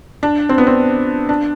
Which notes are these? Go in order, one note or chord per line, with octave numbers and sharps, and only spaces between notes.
D4
C4
B3
C4
D4